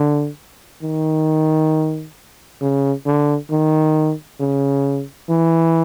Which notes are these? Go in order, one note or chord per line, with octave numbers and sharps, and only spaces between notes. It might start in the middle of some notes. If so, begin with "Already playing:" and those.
Already playing: D3
D#3
C#3
D3
D#3
C#3
E3